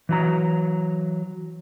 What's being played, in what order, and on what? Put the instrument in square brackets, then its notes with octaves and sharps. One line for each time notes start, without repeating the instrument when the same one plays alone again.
[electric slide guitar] E3 F#3 A#5